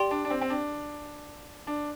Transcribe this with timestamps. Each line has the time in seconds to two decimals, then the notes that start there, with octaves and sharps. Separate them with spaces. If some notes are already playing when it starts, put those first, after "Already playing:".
Already playing: G4 D5 G5 C6
0.11 D4
0.25 D4
0.30 C4
0.41 C4
0.50 D4
1.67 D4